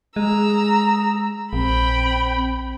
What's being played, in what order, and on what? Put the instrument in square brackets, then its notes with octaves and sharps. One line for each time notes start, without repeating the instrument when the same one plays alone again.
[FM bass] G#3 [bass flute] G#4 [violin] A#5 E6
[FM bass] A#1 [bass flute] C4 [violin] G5 B5